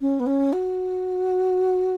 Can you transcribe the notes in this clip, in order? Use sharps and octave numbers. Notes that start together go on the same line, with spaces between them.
C#4
B3
C#4
F#4